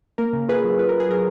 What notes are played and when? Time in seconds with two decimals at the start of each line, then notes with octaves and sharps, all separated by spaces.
0.18 A#3 A#4
0.33 C#3
0.49 F4 G#4 B4
0.64 F#3
0.79 F4 B4
0.89 F#3 A#4
1.00 G#4
1.09 F#3 A#4